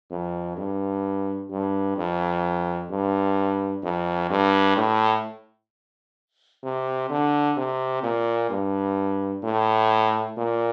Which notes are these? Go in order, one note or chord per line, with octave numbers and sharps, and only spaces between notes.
F2
G2
G2
F2
G2
F2
G2
A2
C3
D3
C3
A#2
G2
A2
A#2